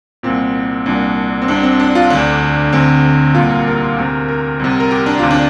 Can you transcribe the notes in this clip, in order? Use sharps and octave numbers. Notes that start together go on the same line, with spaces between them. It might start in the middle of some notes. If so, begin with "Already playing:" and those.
C2 A#2 C4
C2 A#2 D4
C4
C2 C3 D4
C4
D4
F4
D2 D3 D4
D2 D3 C4
C2 A#2 F4
A#4
G4
A#4
D2 C3
A#4
C2 C3
A#4
G4
D4
D2 C3 F4
D4